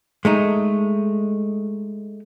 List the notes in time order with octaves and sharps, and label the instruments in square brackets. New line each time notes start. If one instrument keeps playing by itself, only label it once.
[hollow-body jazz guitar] G#3 A3 D#4